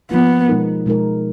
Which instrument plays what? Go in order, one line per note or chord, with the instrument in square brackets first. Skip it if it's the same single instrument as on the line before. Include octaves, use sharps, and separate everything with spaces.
[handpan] F3 A#3 F4 [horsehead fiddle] B3
[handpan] B2 G#3 D#4 A#4
B2 G#3 D#4 A#4